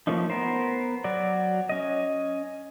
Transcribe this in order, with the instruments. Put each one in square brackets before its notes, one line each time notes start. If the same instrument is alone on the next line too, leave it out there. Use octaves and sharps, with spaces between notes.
[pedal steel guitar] F3 A3 A#3 C#4 D#4
B3 A#4 C5
F#3 F#4 D5
C#4 D#5